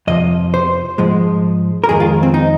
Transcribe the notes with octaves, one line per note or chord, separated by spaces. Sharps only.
F2 C3 F3 D#5
C5
G#2 F3 G#3
A#4
F2 D#3 G#3 G#4
F4
C4
D#4